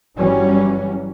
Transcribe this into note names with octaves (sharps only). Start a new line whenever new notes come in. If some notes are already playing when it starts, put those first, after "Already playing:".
G1 E3 F#3 G3 C#4